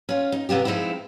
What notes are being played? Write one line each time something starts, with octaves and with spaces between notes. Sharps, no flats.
C#4 F4
D#4
C3 B3 F4 G4
F3 G#3 C4 D#4 E4